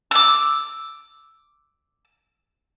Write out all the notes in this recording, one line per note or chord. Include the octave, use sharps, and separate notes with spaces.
D6 E6